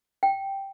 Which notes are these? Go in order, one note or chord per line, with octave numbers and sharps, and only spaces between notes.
G5